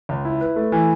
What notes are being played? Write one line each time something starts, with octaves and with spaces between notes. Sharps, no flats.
C#2
E4
B4
A3
E3